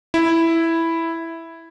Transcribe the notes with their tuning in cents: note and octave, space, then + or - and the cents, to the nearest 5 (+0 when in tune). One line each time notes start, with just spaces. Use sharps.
E4 +0